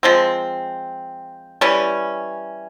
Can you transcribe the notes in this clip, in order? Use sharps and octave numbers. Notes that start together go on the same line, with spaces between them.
F3 G#3 C4
E3 G3 C#4